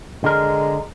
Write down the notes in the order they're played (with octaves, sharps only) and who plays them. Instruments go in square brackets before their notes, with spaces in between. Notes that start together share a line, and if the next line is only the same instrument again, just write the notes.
[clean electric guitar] D3 A#4 [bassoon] G#3